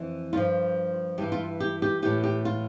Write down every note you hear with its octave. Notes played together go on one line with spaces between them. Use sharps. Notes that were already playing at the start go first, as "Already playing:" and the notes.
Already playing: F2 E3
G2 F3 F4
G2 E3 G4
F4
G4
G4
A2 E3 G4
G4
F4